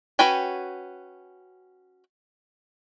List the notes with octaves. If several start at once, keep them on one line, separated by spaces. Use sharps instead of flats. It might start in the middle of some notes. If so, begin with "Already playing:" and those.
C#4 F#4 B4 G5 G#5